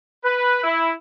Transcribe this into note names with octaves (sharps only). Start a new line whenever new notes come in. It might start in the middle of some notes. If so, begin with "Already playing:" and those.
B4
E4